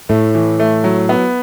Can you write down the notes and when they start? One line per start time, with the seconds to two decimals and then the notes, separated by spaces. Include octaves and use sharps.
0.09 A2 A3
0.35 E3
0.60 A3
0.84 F#3
1.09 B3